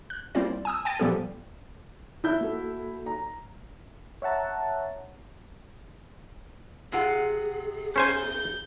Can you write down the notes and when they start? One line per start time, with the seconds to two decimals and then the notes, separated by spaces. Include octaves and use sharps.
0.10 F#6
0.35 G3 A#3 C4 E4 F4 D5
0.65 G#5 D#6 E6
0.85 G5 G#5 A6 D#7
1.00 A#2 F3 G3 B3 G4 A4
2.24 E4 G6
2.41 A#3 F#4 A4
3.06 A#5
4.22 C#5 E5 F#5 A5 A#5
6.92 C3 F4 G#4 F#5
7.96 C#4 C5 G#5 G6